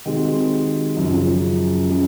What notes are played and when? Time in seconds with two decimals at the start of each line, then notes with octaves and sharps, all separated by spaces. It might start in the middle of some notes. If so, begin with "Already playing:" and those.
0.05 C3 D#3 G#3 C4 F#4
0.97 F#2 C#3 F3
1.89 C#3 G#3